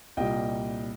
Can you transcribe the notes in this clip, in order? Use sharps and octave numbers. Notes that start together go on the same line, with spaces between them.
C2 A#2 G3 D#5 G5